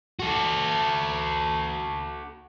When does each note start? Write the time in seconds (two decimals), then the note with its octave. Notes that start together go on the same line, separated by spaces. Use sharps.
0.19 F#4 A4